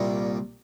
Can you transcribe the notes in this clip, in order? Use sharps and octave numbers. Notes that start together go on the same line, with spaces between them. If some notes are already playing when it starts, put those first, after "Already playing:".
Already playing: C2 A#2 G3